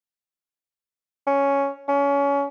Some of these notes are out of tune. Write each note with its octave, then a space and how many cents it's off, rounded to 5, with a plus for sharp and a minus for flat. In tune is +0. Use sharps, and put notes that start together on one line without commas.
C#4 +5
C#4 +25